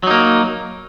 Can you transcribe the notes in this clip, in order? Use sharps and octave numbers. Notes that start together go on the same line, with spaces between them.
F#3 A#3 D#4